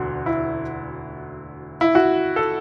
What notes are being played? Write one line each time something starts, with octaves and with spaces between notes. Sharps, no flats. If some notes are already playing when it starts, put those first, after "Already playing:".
Already playing: E1 D2 D3 F#4
E4
E4
F#4
A4